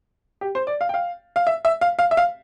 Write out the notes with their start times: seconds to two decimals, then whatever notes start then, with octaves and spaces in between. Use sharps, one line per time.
0.41 G4
0.55 C5
0.67 D5
0.81 F5
0.89 G5
0.94 F5
1.36 F5
1.47 E5
1.65 E5
1.81 F5
1.99 F5
2.11 E5
2.17 F5